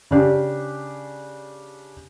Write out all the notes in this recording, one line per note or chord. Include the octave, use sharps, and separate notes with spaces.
C#3 D4 G4